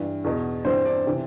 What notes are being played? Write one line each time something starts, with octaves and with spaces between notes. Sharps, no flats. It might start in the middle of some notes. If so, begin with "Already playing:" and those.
Already playing: G2 E3
E2 B2
G2 E3 C4 C5
D4 D5
C3 E3